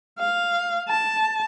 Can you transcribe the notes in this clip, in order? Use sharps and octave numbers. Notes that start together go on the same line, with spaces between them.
F5
A5